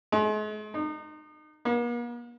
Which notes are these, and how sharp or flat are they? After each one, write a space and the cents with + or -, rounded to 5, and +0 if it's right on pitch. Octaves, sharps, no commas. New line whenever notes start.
G#3 +40
D#4 -30
A#3 +45